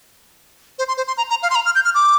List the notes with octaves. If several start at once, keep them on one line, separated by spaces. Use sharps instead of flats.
C5
C6
C5
C6
A#5
A#5
F5
C6
A#5
F6
G6
F6
D6